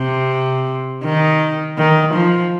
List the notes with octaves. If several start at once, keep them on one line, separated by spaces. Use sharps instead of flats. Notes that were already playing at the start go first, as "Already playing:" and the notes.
Already playing: C3
D#3
D#3
F3